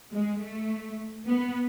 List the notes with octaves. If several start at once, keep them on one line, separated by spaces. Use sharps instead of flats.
G#3
A3
B3